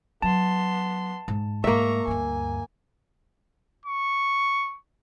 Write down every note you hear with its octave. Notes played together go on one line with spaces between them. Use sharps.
F#3 B3 A5 C6
G#2
G#2 A3 A#3 E5 A#5 C#6
D2 G2 G#5
C#6